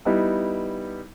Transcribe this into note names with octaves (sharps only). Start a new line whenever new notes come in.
G3 B3 D#4 E4